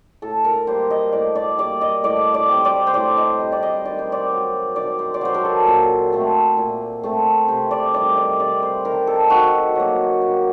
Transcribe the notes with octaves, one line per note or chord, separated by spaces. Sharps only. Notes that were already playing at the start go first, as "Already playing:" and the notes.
A2 A4
A#4
G3 A#3 C5
D#5
A2 D5
D5
G3 A#3 D5
D#5
A2 D5
D5
G3 C4
D5
C5
A2 D5
D#5
G3 C4
D5
D#5
D#3 D5
C5
D5
F#3 C4
D#3 D5
C5
D5
F#3 C4 C5
A#4
A4
A#2
A3 C4
A#2
A3 C4
C3 C5
D5
D#3 G3 D5
D5
C3 D5
C5
D#3 G3 A#4
A4
D#3 F#4
F#3 A#3
D#3